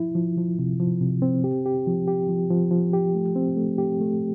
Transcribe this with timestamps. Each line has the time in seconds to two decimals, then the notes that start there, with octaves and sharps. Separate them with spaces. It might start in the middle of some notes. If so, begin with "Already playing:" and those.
Already playing: F3 E4
0.15 F3
0.37 F3
0.59 C3
0.80 F3
1.01 C3
1.22 C4
1.44 G4
1.66 G4
1.87 F3
2.08 G4
2.29 F3
2.51 F3
2.71 F3
2.93 G4
3.15 A3
3.36 C4
3.57 A3
3.78 G4
4.00 A3